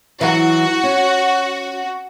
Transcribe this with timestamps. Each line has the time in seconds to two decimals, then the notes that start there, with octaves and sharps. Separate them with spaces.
0.21 E3 F#3 F#4
0.83 C#4